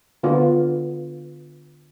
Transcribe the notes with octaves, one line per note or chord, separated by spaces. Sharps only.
D3 B3 F4